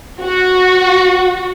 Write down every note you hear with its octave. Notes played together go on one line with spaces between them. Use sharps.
F#4